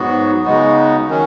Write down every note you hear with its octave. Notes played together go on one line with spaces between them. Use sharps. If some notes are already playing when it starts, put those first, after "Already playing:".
Already playing: G#2 F#3 B3 F#4
C#3 G#3 B3 D#4 F#4
D#3 F#3 C#4